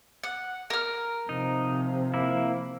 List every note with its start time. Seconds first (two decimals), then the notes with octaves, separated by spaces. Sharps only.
0.23 F#5
0.70 A#4 F6
1.29 C3 F3 D#4
2.14 A#3 E4